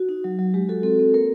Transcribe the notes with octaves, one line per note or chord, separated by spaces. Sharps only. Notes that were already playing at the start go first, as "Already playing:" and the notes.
Already playing: F#4
D#4
F#3
F#3
G#3 G4
F#4 A4
C4 A4
C4
A#3 A#4